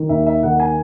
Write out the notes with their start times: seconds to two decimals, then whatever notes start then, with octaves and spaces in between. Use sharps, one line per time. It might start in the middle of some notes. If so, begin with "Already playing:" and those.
Already playing: D#3
0.09 D#2 E5
0.26 E5
0.43 D#3 F#5
0.60 G#5